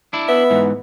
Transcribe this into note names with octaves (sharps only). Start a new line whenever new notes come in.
D4 E4
B3 E5
G#2 E3